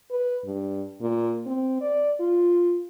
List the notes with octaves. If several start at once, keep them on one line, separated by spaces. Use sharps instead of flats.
B4
G2
A#2
C4
D5
F4